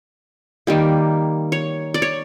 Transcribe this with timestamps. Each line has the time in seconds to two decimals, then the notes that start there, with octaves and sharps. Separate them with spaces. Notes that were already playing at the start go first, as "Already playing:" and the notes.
0.67 D#3 G3 A#3
1.52 C#5
1.94 D5
2.02 C#5